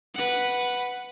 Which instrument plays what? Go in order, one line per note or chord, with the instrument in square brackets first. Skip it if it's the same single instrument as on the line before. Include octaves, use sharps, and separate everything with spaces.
[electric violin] B4 F#5